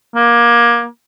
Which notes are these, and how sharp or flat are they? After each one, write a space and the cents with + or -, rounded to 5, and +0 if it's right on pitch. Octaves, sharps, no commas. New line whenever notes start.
A#3 +25